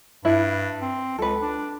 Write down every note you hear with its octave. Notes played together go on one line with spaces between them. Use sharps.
G2 E4 B4 E5
C4
C#2 A4 B4
D4